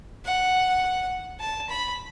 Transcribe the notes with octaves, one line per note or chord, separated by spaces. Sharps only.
F#5
A5
B5